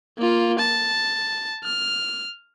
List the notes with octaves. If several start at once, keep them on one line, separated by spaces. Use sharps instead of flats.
A#3 F4
A5
F6